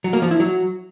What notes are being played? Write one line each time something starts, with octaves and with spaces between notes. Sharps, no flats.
F#3
A#3
F3
E4
F#3